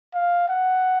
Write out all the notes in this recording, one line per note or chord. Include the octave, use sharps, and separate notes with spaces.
F5
F#5